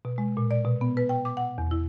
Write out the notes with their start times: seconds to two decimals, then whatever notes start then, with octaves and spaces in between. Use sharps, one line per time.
0.05 B2
0.18 G#3
0.37 A#2
0.51 D5
0.65 B2
0.81 B3
0.97 B4
1.09 G5
1.25 D6
1.37 F#5
1.58 E2
1.71 E4